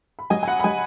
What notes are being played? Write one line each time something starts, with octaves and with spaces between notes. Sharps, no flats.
B5
F#3 D#5 G#5
G#5
F#5 B5
B5
F#3 D#5 G#5